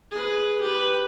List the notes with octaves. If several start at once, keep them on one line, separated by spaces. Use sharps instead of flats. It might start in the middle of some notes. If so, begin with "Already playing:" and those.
G#4 B4
G4 B4